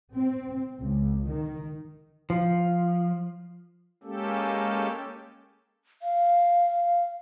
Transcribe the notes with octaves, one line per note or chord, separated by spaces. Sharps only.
C4
C#2
D#3
F3
G#3 A#3 C#4 G4 A4
F5